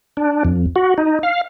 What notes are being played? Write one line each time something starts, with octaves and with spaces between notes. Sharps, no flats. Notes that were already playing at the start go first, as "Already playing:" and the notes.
D4
F2
F#4
D#4
F5